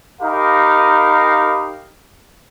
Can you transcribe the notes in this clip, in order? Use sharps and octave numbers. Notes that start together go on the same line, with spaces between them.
D#4 G4 A#4 F5 B5